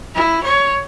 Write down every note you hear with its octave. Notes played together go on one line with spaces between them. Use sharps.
E4
C#5